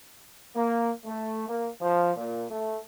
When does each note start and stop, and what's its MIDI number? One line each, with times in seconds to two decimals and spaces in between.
0.56 0.91 58
1.05 1.46 57
1.48 1.68 58
1.81 2.12 53
2.17 2.44 46
2.50 2.81 57